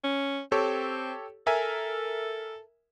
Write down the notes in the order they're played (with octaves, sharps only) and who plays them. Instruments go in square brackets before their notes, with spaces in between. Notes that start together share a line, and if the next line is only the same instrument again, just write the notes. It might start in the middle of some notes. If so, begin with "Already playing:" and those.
[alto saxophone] C#4
[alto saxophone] C4 [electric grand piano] G4 A4 C#5
[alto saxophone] A4 [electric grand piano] A#4 E5 G#5